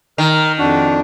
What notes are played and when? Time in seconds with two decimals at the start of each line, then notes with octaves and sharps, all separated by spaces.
0.18 D#3 A#4 F6
0.59 F2 D4 F#4